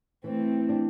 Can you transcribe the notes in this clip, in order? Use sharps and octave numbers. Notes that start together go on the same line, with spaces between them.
E3 A3 C4
D4